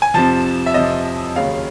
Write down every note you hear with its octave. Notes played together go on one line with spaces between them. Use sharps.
G#5
F2 C3 F3 A5
E5
F2 C3 F3 D#5
D#2 C#3 F#3 F5